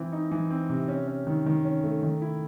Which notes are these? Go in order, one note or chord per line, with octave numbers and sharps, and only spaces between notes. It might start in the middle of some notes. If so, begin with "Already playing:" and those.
Already playing: E3 C4
D#4
E3
C4
C3
C#4
C#4
D#3
D#3
C#4
A3
D#3
E4